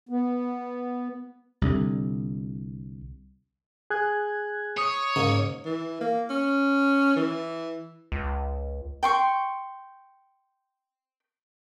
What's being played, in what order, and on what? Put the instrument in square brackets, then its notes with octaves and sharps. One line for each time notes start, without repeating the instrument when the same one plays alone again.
[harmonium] B3
[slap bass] C2 D3
[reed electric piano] G#4 [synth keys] F#6 G#6
[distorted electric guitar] C#5 [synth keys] D#6
[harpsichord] G#2 A#3 [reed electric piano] C#3
[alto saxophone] E3
A#3
C#4
E3
[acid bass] C#2
[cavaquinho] G5 C6 C#6